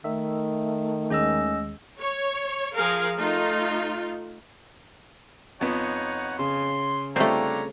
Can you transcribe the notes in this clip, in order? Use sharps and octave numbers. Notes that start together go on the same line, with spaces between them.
D#3 A3 E5
D#2 G#3 C#4 D#5 E6
C#5
F3 G#4 A#4 F5
A3 D#4 F4
F2 B3 D#4 C#5 F#5
C#3 C6
D3 G3 A3 C4 F4 G4 C#5 A#5